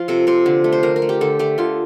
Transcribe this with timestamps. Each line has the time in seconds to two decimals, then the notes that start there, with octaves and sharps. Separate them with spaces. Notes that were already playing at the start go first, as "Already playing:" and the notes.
Already playing: F3 F4
0.08 C3 A4
0.27 C3 C5
0.46 D3
0.64 A3
0.72 C5
0.83 D3 A#4
0.96 A#4
1.02 A3
1.09 G4
1.21 D3 A4
1.39 A3 G4
1.58 D3 F4